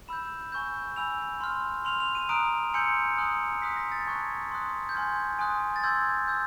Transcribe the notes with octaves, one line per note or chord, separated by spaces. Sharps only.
B5 E6 G6 E7
G#5 C#6 E6 G6
G#5 B5 E6 G6 F7
C6 F6
C6 F6 F7
F7
D#7
A#5 D#6 F#6 D7
G#5 C6 E6 G6 C#7
G#5 C6 D#6 F#6
C6 D#6 F#6 B6
A#6
A6
A5 C#6 F#6 G#6
C6 D#6 F#6
G6
G#5 C6 F6 G#6
G#5 C6 D#6 F#6
A6
C6 E6 G6 G#6
E6 G6